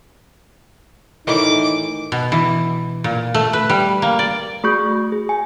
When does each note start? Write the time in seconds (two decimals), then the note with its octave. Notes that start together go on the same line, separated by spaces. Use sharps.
1.27 A2 D#3 E3 D#4 D6
2.12 B2
2.32 E3
3.04 A#2
3.34 A3
3.53 B4
3.70 G3
4.02 A#3
4.19 D5
4.64 A3 F#4 G#4 C#6 D#6 G6
5.12 G#4
5.29 G#5